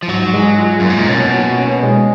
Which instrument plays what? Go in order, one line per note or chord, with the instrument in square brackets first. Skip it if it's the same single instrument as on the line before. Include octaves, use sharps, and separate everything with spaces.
[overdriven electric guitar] F3
[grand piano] G#2 [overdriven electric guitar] F#3
[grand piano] G#3
F4
[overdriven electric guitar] F#2 [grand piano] A#3
[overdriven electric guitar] G#2
A#2
[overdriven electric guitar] B2 [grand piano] C#4
[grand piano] F#3
C#4
G#3